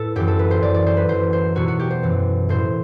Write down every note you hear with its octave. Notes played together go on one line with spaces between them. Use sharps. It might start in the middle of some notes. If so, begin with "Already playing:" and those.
Already playing: A2 A4 B4
F#2 E3 G4
A4
B4
C5
F#2 E3 D5
D5
C5
B4
F#2 E3 C5
C5
E2 B2 F#3 F#4
F#4
G4
C5
F#2 E3
A2 E3 C5